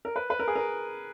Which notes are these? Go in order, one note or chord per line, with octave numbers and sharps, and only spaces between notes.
A#4
B4
B4
A#4
G#4
A#4